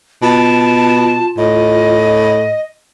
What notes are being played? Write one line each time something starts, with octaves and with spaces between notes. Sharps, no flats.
B2 F4 A5
A2 D#5